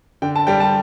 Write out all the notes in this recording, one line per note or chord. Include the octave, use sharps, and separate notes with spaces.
D3 G5
A5
G3 G5
A5